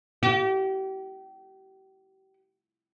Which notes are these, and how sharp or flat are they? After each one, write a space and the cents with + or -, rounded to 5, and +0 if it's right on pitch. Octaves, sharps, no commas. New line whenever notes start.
G4 -35